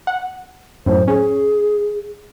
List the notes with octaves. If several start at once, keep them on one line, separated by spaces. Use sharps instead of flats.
F#5
F#2 A2 C5
C#4 G#4